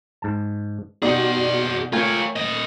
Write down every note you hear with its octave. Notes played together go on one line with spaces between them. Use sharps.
G#2 A5
B2 D#4 G4 G#4 D5 F#5
A3 F4 A#4 C#5 G5 G#5
A#2 D#5